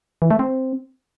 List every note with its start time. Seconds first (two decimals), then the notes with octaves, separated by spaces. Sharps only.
0.22 E3
0.31 A3
0.39 C4